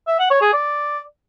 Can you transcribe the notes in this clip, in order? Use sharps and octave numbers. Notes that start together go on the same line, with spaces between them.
E5
F#5
C#5
G#4
D5